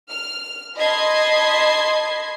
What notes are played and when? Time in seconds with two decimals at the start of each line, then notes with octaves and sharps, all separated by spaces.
0.10 F6
0.77 D#5 A5 B5 C6 G#6 C7